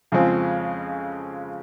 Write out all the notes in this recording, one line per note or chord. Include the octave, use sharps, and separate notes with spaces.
F2 C#3 F3 G#3 C4